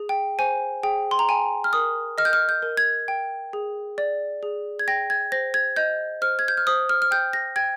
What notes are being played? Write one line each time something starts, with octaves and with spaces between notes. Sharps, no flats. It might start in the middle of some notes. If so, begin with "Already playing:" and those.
Already playing: G#4
G5
C5 G#5
G#4 G5
C6
A#5
G5 G#5
F6
A#4 D#6
D#5 F6
G6
F6
G6
A#4
G#6
G5
G#4
D5
G#4
G#6
G5 A#6
G#6
C5 A#6
G#6
D#5 G6
C5 F6
G#6
G6
F6
C5 D#6
F6
F6
G5 G6
A#6
G5 G#6